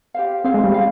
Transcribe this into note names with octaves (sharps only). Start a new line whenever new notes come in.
G4 C5 F5
C4 G#4 C5 F5
G#3
G3
F5